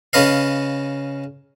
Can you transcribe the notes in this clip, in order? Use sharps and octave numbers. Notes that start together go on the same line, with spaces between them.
C#3 C#4 B4 D#5 F5